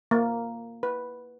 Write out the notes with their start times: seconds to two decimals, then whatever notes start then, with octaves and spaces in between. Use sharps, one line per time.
0.11 A#3
0.83 B4